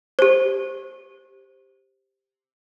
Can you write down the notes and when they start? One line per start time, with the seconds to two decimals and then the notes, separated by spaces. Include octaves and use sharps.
0.19 G4 C5